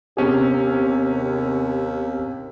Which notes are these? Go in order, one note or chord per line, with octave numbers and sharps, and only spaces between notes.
D#2 C3 B3 C#4 G4 G#4